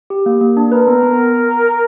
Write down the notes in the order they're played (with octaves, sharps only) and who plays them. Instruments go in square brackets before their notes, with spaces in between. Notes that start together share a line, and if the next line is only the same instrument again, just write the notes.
[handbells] G4
A#3
A#3
D4
[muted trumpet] A#4 [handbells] B4
[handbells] B3
B3